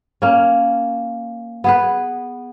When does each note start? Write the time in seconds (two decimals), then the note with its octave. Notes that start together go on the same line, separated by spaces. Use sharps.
0.22 A#3 C#4
1.64 B3 G#4 B4